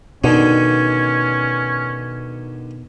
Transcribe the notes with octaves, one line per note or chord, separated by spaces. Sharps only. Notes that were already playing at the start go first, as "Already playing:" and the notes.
B2 D3 D#3 C#4